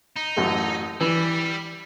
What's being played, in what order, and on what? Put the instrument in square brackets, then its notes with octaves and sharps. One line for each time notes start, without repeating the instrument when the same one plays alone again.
[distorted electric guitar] D#4
[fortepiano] A1 F#2 A3
[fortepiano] E3 [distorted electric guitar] G3